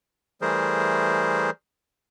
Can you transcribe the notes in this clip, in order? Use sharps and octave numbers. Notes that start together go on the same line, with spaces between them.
E3 G3 A3 G#4 A#4 C5